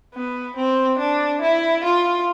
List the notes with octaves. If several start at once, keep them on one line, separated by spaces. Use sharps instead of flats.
B3
C4
D4
E4
F4